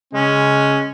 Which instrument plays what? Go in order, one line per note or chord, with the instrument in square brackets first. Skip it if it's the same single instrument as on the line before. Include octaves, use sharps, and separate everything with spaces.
[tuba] C#3 [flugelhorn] G#3 [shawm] C#4